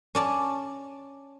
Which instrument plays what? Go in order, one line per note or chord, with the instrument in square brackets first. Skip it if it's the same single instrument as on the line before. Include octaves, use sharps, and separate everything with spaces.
[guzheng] C#4 D5 A5